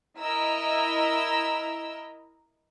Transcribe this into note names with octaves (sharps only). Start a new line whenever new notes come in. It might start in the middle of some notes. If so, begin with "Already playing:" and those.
E4 A#4 D#5 A#5 E6